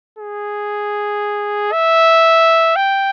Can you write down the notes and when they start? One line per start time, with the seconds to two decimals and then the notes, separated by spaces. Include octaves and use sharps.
0.19 G#4
1.73 E5
2.76 G5